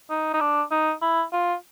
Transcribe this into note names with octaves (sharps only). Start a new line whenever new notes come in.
D#4
D#4
D4
D#4
E4
F4